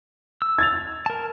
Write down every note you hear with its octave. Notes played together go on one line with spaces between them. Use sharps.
E6
G#6 A6 F7
A#4 A5